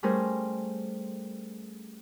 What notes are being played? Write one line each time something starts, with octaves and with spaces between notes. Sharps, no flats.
G3 A3 C#4 G#4 A#4 C5